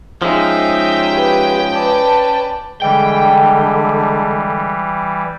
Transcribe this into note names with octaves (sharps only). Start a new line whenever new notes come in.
F3 G#3 C#4 D#4 E5 G5
G4 B4
B4 D5 A5
D3 E3 G3 G#3 G5